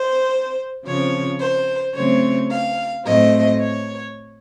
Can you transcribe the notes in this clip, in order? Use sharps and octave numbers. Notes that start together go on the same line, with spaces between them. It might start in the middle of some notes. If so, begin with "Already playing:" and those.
Already playing: C5
C#3 F3 C4 C#5
C5
C#3 F#3 A3 C4 C#5
F5
A2 F#3 A3 C4 D#5
C#5